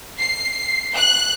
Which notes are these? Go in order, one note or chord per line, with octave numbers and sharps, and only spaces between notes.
C7
F#6